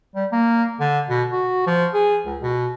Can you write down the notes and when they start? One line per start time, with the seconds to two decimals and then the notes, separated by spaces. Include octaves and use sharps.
0.15 G3
0.32 A#3
0.80 D3
1.09 B2
1.31 F#4
1.66 F3
1.93 G#4
2.26 C#2
2.41 B2